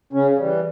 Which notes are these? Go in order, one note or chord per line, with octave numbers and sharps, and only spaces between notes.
C#3 C#4
E3 G3